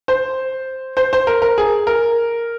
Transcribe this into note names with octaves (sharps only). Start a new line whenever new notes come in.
C5
C5
C5
A#4
A#4
G#4
A#4